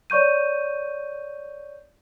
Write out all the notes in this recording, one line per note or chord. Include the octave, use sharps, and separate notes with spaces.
C#5 D5 C#6 G6 D#7